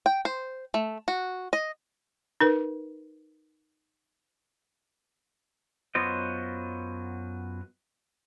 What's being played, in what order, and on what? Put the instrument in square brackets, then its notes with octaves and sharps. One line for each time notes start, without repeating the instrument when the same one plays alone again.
[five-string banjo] G5
C5
A3
F#4
D#5
[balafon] D#4 A#4 B4
[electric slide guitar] F#2 F#3 B3 F4 C5 D#5